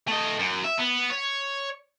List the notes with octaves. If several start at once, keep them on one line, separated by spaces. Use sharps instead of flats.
A3 D#5
F#2
E5
B3
C#5